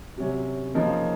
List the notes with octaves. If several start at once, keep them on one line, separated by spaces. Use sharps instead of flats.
C3 F#3 C#4
C#3 F3 A#3 D#4